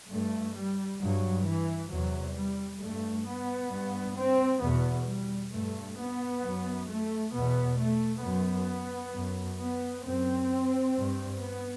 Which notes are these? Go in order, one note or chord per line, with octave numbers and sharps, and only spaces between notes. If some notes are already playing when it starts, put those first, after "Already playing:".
G2 A3
G3
G2 F#3
E3
E2 C3 F#3
G3
G2 A3
B3
G2
C4
E2 B2 B3
G3
G2 A3
B3
F#2
A3
E2 B2 B3
A3
F#2 B3
F#2
B3
F#2 C4
G2
B3